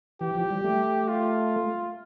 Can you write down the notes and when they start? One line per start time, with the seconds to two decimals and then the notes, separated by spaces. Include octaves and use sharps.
0.21 E3 G4
0.35 F3
0.51 G3
0.64 A3
1.08 F4